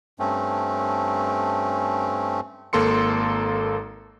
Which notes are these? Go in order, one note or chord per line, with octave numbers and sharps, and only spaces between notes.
G2 A3 C4 C#4
G#1 A#3 A4 C6 C#7